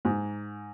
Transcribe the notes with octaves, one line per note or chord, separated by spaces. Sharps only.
G#2